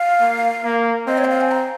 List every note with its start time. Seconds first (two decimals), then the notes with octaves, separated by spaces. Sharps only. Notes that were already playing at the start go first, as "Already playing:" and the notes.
Already playing: F5
0.20 A#3
0.64 A#3
1.07 C4 D#5
1.18 C#5
1.24 G5
1.30 F5
1.41 G#5
1.51 A#5